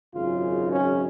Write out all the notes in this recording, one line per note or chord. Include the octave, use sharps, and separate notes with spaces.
G#1 F#2 C#3 G#3 F4
C#4